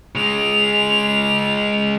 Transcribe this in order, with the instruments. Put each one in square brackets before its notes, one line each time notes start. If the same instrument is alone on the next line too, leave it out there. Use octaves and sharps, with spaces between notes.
[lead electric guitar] C#3 G#3 [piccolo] F7